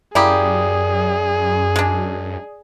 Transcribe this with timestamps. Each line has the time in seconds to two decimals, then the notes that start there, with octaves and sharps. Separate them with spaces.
0.15 F#2 A#3 E4 G4 G#4 D5 D#6
1.76 G#3 D4